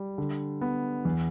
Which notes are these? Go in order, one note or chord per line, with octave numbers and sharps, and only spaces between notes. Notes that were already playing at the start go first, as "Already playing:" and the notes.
Already playing: G3
D3
B3
E2